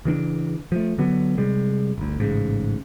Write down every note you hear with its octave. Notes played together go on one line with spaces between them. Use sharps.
C#3 E3 C4 D4
F3 A3
D3 F#3 B3
C3 G3 G#3
G1 D2
A1 G#2 C#3